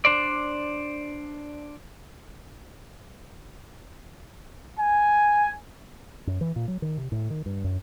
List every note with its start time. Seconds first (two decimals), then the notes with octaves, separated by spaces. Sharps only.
0.05 D4 C5 D5
4.80 G#5
6.27 F#2
6.41 E3
6.56 A#2
6.68 F#3
6.82 D#3
6.98 C3
7.12 A2
7.30 D#3
7.46 G2
7.64 F#2